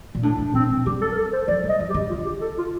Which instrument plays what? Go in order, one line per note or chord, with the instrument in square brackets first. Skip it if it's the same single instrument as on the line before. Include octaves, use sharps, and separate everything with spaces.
[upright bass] A#2
[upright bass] A2 [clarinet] D4
[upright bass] A2
[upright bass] A#2 [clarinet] C4
[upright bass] A#2
[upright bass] G3 [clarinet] G4
[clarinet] A4
A#4
A4
C5
[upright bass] F3 [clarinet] D5
[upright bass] G3
[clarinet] D#5
[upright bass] F3
[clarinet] G4
[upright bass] D3
[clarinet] F4
G4
A4
F4